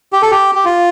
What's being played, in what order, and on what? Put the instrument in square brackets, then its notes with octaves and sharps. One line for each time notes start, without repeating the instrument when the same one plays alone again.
[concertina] G4
A4
G4
G4
F4